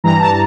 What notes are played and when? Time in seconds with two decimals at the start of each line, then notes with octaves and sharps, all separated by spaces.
0.04 G2 E3 G3 A#5
0.19 A5